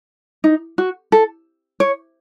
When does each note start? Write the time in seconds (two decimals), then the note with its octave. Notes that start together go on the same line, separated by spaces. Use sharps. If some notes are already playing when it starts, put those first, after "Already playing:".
0.44 D#4
0.78 F#4
1.12 A4
1.80 C#5